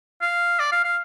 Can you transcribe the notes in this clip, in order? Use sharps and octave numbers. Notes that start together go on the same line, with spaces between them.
F5
D5
F5
F5